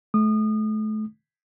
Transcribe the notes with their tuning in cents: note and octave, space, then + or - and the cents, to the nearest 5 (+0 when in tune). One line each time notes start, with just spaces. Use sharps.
A3 -35 D#6 -30